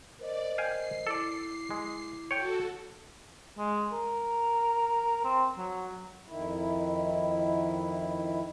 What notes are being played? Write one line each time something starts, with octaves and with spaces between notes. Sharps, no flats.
A#4 C5 D5 D#5
F5 G5 G#5 C7
E4 A4 D5 D6
G#3
F#4 A4 C#5 G5
G#3
A#4
C4
F#3
F2 D#3 E4